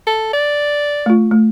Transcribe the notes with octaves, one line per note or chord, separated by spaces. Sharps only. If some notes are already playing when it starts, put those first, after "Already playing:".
A4
D5
A3 F4
A3